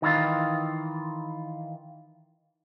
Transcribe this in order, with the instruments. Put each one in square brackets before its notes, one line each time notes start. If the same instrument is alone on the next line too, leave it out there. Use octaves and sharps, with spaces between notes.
[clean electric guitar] D#3 E3 F4